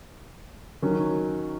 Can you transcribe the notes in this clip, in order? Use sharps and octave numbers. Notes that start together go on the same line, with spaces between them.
D#3 F#3 C#4